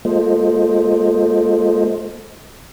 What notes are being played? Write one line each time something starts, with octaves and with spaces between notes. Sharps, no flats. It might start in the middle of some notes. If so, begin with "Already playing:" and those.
G#3 A#3 F4 A4 C5 D#5